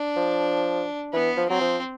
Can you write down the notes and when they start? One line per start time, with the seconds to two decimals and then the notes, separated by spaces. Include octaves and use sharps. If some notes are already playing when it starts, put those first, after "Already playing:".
Already playing: D4
0.16 F3
1.13 E3 B3
1.37 F3
1.49 F#3 C4
1.61 F3